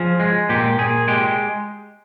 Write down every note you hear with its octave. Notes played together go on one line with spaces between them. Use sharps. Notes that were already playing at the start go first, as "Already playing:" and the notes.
Already playing: F3 G#4
G#3
A#2 G4
A#2 G#4
G#3 G4